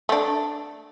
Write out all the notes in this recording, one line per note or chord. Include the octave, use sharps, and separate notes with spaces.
A3 D4